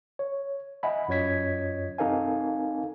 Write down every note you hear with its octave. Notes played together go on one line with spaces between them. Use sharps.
C#5
D#5 E5 F#5 G#5 B5
F#2 F4 C#5 D#5 G#6 B6
C4 D#4 A4 A#4 F5 G#5